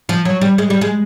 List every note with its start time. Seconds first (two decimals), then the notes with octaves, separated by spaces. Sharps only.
0.09 F3
0.25 F#3
0.41 G3
0.58 G#3
0.70 G3
0.81 G#3